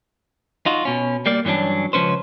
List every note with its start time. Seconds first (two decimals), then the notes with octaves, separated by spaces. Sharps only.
0.66 D#4 F4 F#4
0.85 B2 C#4
1.26 G3 A#3 D5
1.45 G2 E3 F#3 C#4 D4
1.93 C#2 F3 C#4 B4 C5